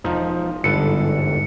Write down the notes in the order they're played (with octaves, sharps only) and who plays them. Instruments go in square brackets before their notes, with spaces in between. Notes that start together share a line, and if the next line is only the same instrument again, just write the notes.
[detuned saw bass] E1 [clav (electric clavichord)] F3 D#4
[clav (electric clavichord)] G1 A4 B4 [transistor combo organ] G#2 D3 [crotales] C#7